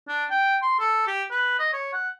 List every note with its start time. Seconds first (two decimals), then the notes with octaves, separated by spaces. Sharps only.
0.08 D4
0.30 G5
0.62 C6
0.80 A4
1.07 G4
1.31 B4
1.59 D#5
1.73 C#5
1.93 F#5